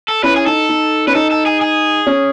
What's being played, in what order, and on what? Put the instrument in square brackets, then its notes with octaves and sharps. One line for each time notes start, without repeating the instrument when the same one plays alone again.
[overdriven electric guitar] A4
[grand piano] C#4 E4 [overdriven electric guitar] B4
[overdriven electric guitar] G#4
[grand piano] D#4 [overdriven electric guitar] A4
[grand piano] D#4
[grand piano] C#4 [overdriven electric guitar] B4
[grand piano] D#4 [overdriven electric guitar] A4
[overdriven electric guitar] A4
G#4
G#4
[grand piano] C#4